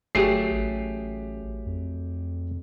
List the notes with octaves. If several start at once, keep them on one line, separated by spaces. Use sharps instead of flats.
G1 F#3 A3 G4 G#4 C7
A1
F2